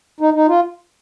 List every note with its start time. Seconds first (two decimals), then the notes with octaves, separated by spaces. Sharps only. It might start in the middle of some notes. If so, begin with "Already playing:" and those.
0.20 D#4
0.34 D#4
0.48 F4